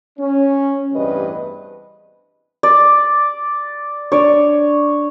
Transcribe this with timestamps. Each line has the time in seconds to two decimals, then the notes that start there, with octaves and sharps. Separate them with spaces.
0.19 C#4
0.94 A1 E2 G2 C3 B4 D#5
2.63 D5
4.12 D4 C#5 D5